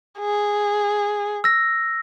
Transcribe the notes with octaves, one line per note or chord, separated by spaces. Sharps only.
G#4
E6 A#6